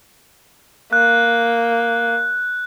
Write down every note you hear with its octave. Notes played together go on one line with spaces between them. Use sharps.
A#3 F#6